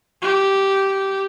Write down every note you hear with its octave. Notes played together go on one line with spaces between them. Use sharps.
G4